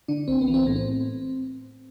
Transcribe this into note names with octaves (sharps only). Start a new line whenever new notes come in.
D3 D4
B1 C4
B3
E3
C4
A2 B3
C4